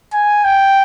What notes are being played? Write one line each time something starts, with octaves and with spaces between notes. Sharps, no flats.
G#5
G5